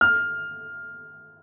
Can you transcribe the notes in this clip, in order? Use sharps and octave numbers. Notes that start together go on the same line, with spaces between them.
F6